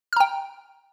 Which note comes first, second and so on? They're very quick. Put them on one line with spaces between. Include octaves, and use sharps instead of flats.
F6 A#5 G5